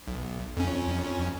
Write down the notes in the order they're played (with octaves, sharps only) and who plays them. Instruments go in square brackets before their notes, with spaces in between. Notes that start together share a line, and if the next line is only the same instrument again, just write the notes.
[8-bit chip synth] B1
F2 C#4